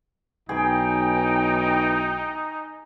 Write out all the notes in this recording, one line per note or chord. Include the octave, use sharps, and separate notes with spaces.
B1 E3 D#4 G#4 G5